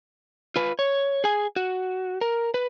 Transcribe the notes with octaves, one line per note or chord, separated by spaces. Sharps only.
F4 B4
C#5
G#4 G#5
F#4
A#4
B4